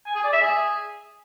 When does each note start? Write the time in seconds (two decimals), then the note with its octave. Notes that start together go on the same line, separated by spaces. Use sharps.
0.06 G#5
0.15 G#4
0.24 D5
0.33 E5
0.42 G#4